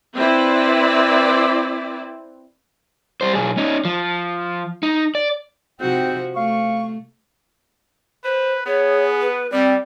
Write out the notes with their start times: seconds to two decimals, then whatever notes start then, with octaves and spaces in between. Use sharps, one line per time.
0.16 C4 E4 B4 D5
3.21 G3 C5
3.35 B1 G#4
3.57 C#4 D#4
3.85 F3
4.83 D#4
5.15 D5
5.81 G#2 C3 F3 C4 F#4 G5
6.36 A3 F5 C#6
8.24 B4 C5
8.66 B3 G#4 C#5
9.21 B4
9.52 G3 C4 D5